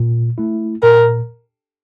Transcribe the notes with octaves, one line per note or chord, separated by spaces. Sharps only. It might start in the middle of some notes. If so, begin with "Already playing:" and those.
Already playing: A#2
A3 E4
A#2 A#4